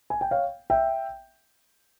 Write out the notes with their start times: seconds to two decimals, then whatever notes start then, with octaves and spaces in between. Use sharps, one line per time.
0.10 G#5
0.21 G5
0.31 C#5 F5
0.70 E5 G5